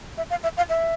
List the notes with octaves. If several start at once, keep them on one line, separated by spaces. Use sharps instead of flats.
E5
F5
E5
F5
E5